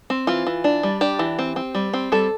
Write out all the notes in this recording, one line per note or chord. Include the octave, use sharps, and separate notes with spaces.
C4
E3 F4
E3
D4
G3
D4 G4
E3
C4
C4
G3
C4
G3 A4